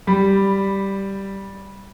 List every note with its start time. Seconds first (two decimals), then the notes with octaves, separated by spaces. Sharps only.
0.07 G3 B5